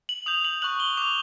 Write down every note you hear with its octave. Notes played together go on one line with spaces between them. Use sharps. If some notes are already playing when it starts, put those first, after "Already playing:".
F#7
D#6 G6 F7
F#7
C#6 F#6 F#7
G7
D6 F#6 F7